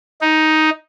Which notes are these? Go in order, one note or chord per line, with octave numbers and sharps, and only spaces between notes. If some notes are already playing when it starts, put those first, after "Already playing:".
D#4